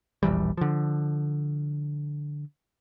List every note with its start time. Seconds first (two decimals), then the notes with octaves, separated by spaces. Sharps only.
0.23 E1 A#1 E3 G3
0.57 D3 F3